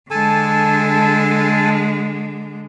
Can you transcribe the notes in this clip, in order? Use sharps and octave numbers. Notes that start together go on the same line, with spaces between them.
D3 G#3 A4 G#5 A5